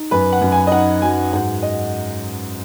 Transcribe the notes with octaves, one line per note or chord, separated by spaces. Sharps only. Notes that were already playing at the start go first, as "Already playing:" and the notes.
Already playing: D#4
F#2 B4
F#5
F#2
G#5
D#5
D#4 F#5
F#3 G#5
G#2 F#5
D#5